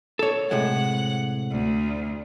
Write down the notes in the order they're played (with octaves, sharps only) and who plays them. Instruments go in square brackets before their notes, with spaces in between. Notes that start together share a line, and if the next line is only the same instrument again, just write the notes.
[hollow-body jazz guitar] A4 C#5
[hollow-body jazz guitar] A2 C3 G#3 [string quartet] F#5
[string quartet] D2